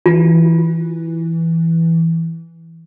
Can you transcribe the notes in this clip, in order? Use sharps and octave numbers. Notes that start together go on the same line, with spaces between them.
E3 F4